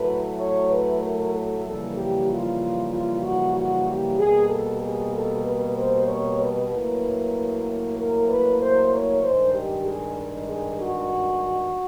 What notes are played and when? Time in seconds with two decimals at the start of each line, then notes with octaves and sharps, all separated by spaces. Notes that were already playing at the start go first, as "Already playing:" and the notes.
Already playing: A2 F#3 A3 B4
0.39 C#5
0.70 B4
1.02 A#4
1.34 A4
1.65 F2 C#3 E3 G3 A#3 A4
1.96 G4
2.29 F4
2.92 F4
3.23 F#4
3.55 F#4
3.86 G4
4.18 B2 G3 A#3 G#4
4.50 A4
4.81 G#4
5.13 A4
5.44 B4
5.76 C5
6.07 C#5
6.40 B4
6.71 A2 F#3 A#3
7.97 A#4
8.28 B4
8.60 C5
8.92 C#5
9.23 G2 D#3 G#3 C5
9.55 G4
9.87 G#4
10.50 G#4
10.82 F#4